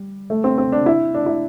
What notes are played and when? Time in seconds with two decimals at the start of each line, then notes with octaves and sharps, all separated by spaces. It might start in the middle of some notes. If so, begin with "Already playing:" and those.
Already playing: G3
0.30 A3
0.44 C4
0.58 C4
0.72 D4
0.86 E4
1.14 D4
1.26 E4